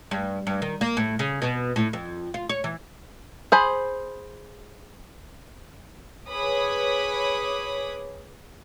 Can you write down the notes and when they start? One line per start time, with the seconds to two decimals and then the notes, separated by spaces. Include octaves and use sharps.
0.11 G2
0.47 G2
0.62 D#3
0.81 A#3
0.97 A2
1.19 C#3
1.42 B2
1.76 A2
1.93 F2
2.34 F4
2.49 C#5
2.64 E3
3.52 G#4 C5 B5
6.29 G#4 B4 C#5 B5 D6 D#6